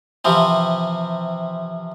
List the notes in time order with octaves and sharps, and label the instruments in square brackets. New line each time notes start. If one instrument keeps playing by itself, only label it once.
[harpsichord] C3 E3 F3 C4